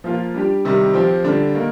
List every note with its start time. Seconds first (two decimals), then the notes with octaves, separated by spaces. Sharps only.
0.04 F3 A#3 F4
0.34 G3 D4 G4
0.65 C3 D#3 G3
0.94 F3 C4 G4
1.24 D3 G3 D4
1.54 D#3 A#3 D#4